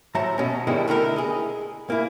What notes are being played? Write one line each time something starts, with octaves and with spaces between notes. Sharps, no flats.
A2 F#3 A3 C5 A5 A#5
B2 C#4
B2 D#3 G3 G#3 E4
D3 A3 E4 A#4
G#4 D#5
A#3 E4